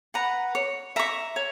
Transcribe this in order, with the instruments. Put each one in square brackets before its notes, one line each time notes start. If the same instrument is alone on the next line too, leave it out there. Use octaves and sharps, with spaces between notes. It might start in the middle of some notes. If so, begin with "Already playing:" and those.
[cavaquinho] B4 F#5 A#5
C#5
E5 A#5 C#6
C#5